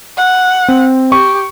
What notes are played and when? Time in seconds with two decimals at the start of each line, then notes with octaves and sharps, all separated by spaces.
0.18 F#5
0.68 C4
1.12 G4 C#6